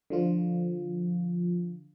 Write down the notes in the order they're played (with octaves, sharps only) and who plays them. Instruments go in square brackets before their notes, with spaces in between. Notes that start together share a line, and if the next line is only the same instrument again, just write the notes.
[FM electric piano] D3 F3 F4